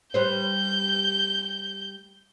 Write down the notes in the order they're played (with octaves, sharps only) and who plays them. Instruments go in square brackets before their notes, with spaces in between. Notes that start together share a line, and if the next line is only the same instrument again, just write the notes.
[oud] G3 B4 C5 [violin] G6